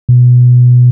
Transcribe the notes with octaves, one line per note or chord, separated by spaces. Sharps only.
B2